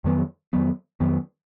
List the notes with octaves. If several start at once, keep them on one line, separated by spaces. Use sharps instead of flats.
F2 D#3 F#3 B3
F2 D#3 F#3 B3
F2 D#3 F#3 B3